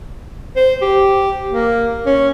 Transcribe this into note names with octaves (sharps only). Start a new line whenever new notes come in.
C5
G4
A#3
C#4